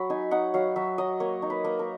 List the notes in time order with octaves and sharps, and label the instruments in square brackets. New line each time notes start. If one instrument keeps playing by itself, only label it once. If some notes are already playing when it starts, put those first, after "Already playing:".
Already playing: [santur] F#3 B5
D#4 G#5
D#4 F#5
F#3 F5
F#3 E5
F#3 D#5
A#3 C#5
D#4
B4
A#3
A#4